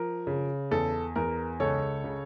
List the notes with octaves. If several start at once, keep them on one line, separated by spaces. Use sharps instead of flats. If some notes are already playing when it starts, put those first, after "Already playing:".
Already playing: F3 A#4
C#3
E2 A4
E2 A#4
C#2 A4 C#5
C#3